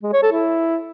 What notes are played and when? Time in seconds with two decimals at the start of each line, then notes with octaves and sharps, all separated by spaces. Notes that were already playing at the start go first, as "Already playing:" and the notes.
0.03 G#3
0.13 C#5
0.23 A4
0.33 E4